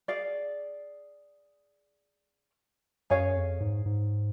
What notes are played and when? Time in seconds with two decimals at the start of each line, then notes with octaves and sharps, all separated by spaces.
0.08 G#4 D5 F5
3.10 F#2 G#4 C#5 F5 G#5
3.36 F2
3.60 G#2
3.86 G#2